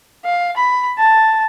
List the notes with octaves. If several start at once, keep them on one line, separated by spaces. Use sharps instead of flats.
F5
B5
A5